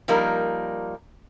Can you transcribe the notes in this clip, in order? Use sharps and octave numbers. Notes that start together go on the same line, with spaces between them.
F3 G3 A#3 D#4 A#4